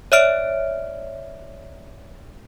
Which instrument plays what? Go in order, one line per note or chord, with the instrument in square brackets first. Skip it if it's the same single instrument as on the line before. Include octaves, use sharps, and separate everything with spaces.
[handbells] C#5 D5 E5 F6 D7